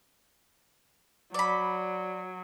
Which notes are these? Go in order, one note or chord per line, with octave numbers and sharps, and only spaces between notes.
F#3 D5 B5